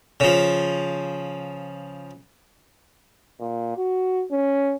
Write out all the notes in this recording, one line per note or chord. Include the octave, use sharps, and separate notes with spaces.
C#3 F3
A#2
F#4
C#4